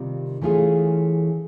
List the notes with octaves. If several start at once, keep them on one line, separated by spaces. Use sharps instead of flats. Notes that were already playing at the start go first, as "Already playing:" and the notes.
Already playing: C3 D#3 G3 C4 F4
E3 A3 C#4 F4 G#4